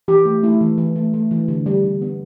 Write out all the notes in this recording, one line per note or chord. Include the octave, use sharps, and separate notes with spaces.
E3 G4
A3
A3 E4
E3
E3
A3
A3
E3
D3
G3
D3
B3